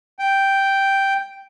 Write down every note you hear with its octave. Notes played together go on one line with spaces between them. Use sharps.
G5